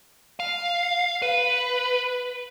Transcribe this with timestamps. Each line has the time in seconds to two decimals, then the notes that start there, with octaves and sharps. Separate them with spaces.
0.40 F5
1.22 B4